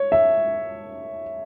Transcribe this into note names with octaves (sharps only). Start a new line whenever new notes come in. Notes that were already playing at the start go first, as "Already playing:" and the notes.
Already playing: C#5
E5